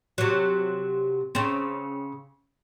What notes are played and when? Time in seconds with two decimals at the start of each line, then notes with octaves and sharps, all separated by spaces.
0.18 C3 F#3
1.35 C#3 C4